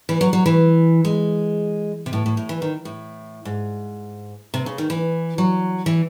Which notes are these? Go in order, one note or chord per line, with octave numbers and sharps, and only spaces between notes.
E3
F#3
F#3
E3
G#3
C3
A2
A2
A2
E3
D#3
A2
G#2
C3
C#3
D#3
E3
F#3
E3